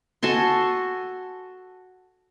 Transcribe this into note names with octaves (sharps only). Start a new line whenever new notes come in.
F#4 A4 G#5 C6